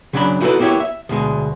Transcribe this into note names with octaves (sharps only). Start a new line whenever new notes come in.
C#3 F#3 C#4 D4 F5 B5
D#4 E4 F#4 G#4 A4 B4
A#3 B3 E4 G4 C#5
E5
D2 B2 G#3